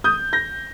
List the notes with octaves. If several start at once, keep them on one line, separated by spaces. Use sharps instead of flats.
D#6 G6
G6 A#6